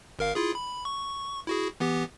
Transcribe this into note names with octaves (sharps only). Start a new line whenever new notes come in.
G#1 A#4 F5
E4 F4 G#4
B5
C#6
E4 F#4 G#4
E3 B3 G4